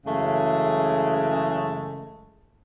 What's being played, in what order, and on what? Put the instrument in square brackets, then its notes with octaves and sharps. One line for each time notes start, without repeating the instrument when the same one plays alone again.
[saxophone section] F#2 C#3 E3 G#3 A3